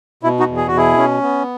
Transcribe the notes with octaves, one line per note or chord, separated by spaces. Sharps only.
B2 E4
D#4 F#4
E2
G#4
F#4
B2 E4 G#4
C#4
B3